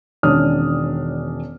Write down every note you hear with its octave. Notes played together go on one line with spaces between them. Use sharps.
E1 D#3 C#4 D4 D#6 F6